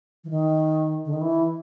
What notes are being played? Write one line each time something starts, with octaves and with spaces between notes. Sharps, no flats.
E3
D#3
D3
D#3
E3